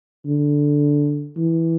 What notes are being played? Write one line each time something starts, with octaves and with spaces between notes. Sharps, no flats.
D3
E3